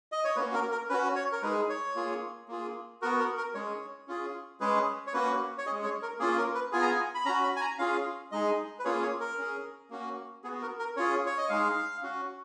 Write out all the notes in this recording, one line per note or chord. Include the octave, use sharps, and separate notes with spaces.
D#5
C#5
A#3 C#4 F#4 B4
A#4
A#4
C#4 F#4 B4
C#5
A#4
G#3 D#4 G#4 B4
C#5
A#3 F4 G#4
A#3 F4 G#4
B3 F#4 A#4
A#4
A#4
G#3 C#4 G#4 C#5
C#4 F4 G#4
G#3 C#4 G#4 B4
C#5
A#3 C#4 F#4 B4
C#5
G#3 C#4 G#4 D#5
C#5
A#4
A#3 C#4 F4 G#4
A#4
B4
B3 F4 G#4 G#5
A#5
G#5
B5
C#4 F#4 A#5
B5
G#5
A#5
C#4 F4 G#4 F5
G#3 D#4 G#4 D#5
B4
A#3 C#4 F4 G#4 C#5
C#5
A#4
C#4 G#4
A#3 C#4 F#4
B3 F#4 G#4
A#4
A#4
C#4 F4 G#4 C#5
C#5
D#5
G#3 D#4 G#4 F5
C#4 F#4